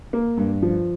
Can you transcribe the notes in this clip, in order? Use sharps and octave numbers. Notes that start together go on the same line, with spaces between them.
A#3
G2
F3